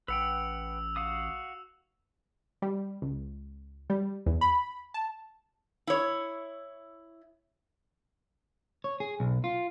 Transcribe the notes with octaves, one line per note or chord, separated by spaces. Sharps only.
A1 B4 F#5 G5 E6 F7
F#4 F5 D#6
G3
C#2
G3
E2
B5
A5
E4 C#5
C#5
G#4
B1
F4